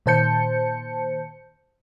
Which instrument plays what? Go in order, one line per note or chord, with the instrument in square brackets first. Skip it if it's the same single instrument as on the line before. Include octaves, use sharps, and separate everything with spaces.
[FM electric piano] A#2 D#3 C5 A5 G6 C#7